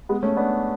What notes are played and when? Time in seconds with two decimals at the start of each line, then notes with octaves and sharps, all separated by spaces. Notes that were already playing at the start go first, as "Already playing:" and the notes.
0.09 G#3 B3
0.23 A3 C#4
0.37 B3 D4